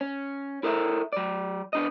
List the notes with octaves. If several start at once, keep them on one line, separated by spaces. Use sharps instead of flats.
C#4
E4 A4 A#4 D5 E5
F#3 D5
B3 D4 D#5